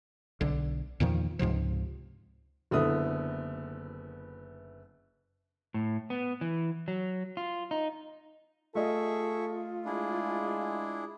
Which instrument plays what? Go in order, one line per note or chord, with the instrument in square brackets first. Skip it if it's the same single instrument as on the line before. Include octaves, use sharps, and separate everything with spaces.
[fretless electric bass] B1 D3
E2 A#2 D#3 F3
C#2 G#2 C3 F3
[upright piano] F#1 D3 B3 E4 D#6
[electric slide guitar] A2
B3
E3
F#3
F4
D#4
[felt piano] A3 D#5 [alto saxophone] F4 [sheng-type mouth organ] G#4 E5 C#6 [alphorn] A4
[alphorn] G#3 [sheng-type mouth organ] D4 E4 G#4